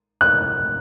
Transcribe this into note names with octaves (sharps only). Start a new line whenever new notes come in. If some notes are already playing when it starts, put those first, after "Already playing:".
F#6